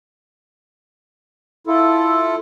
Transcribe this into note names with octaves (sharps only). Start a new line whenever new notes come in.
E4 F4 A4